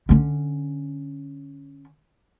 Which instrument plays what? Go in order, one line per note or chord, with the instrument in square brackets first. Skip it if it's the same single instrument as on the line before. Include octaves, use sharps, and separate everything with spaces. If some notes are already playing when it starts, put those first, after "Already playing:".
[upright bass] D3 C#4